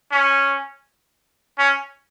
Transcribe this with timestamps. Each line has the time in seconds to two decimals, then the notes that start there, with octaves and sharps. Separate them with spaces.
0.12 C#4
1.59 C#4